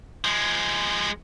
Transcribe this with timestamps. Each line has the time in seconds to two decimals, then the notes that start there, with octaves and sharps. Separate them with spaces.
0.25 F3 G#3